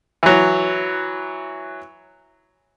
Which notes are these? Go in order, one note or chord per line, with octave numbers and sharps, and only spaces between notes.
E3 F#3